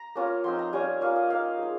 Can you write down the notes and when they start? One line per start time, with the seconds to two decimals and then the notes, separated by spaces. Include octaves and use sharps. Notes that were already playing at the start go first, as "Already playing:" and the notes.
Already playing: A#5
0.16 A#3 C#4 F4
0.44 F3 C4 D#4 C6
0.59 A#5
0.73 G3 C#4 F4 G#5
1.01 A#3 C#4 F4 F5
1.16 D#5
1.29 A#3 D#4 F5
1.58 G#3 D#4